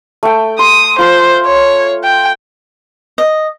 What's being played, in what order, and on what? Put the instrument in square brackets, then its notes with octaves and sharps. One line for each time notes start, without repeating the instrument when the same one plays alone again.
[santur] A3 G5
[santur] C6 [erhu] D#6
[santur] F4 C6 [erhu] C5
[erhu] C#5
G5
[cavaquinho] D#5